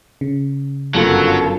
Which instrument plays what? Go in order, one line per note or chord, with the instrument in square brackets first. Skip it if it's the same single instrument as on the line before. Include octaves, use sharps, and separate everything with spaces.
[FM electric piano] C#3
[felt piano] G1 F#2 [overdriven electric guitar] F#3 [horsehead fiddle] F4 A4